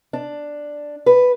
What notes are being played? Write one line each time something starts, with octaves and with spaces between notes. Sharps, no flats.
D4
B4